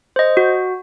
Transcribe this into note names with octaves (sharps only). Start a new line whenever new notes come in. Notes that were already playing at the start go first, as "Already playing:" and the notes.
C5 D#5
F#4